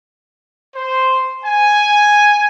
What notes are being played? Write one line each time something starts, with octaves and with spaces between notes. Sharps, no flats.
C5
G#5